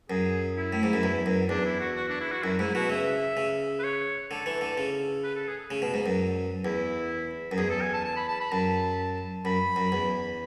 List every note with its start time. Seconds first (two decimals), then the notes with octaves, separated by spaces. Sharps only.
0.10 F#2 G#4
0.57 E4
0.73 A2
0.83 G#2
0.93 F#2
1.03 E2
1.26 F#2
1.49 E2 D4
1.65 E4
1.80 F#4
1.96 F#4
2.09 D4
2.20 E4
2.32 F#4
2.43 F#2 E4
2.59 G#2 E4
2.75 B2 F#4
2.90 C#3 E5
3.37 C#3
3.79 B4
3.84 C#5
4.31 D3 A4
4.46 E3
4.61 D3
4.77 C#3
5.23 B4
5.35 A4
5.47 G#4
5.71 C#3
5.82 B2
5.94 G#2
6.06 F#2
6.65 E2 E4
7.51 F#2
7.57 E2 G#4
7.70 A4
7.81 G#5
7.94 A5
8.04 A5
8.16 B5
8.28 A5
8.40 B5
8.52 F#2 A5
9.45 F#2 B5
9.76 F#2
9.92 E2